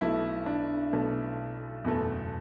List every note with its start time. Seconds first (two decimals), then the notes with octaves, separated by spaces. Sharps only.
0.01 B1 B2 A3 E4
0.46 D4
0.92 B1 B2 A3
1.84 F#1 E2 B2 A3